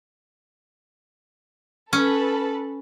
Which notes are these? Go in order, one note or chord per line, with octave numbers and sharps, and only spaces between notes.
C#4 A4 B4